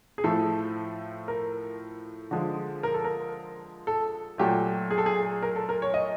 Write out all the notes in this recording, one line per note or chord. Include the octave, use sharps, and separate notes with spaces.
G#4
A2 F3 A3 A4
A#4
D3 F3 G#3
A#4
A4
A#4
A4
A#2 F#3 A3 G4
G#4
A4
G#4
A#4
A4
A#4
C#5
D#5